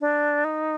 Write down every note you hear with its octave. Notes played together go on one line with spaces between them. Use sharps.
D4
D#4